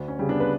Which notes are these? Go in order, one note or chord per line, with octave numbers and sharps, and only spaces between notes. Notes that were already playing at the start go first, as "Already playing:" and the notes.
Already playing: D2
C#4
C#3 G3
B3 D4
B4